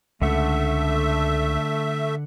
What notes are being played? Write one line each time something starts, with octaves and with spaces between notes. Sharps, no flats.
C#2 D3 A3 E5 F#5